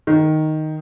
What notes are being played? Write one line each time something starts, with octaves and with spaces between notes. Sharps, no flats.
D#3